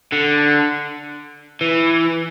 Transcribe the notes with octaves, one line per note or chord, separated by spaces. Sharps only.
D3
E3